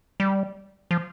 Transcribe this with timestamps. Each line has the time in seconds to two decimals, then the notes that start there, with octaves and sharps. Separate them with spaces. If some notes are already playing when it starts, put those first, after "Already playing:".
0.20 G3
0.91 F3